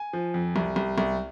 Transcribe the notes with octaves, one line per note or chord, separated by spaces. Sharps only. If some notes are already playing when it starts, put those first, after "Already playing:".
Already playing: G#5
F3
F2
C2
C2
C2